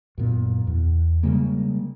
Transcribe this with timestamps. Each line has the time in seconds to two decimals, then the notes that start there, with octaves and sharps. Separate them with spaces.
0.18 F#2 A#2 B3
0.67 E2
1.23 C#3 G3 G#3 A#3